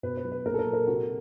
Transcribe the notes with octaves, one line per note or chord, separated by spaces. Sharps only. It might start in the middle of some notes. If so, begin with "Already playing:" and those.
B2 B4
B4
F#3
B4
A#2 A#4
A4
A#4
F#3
A#4
C3 F#4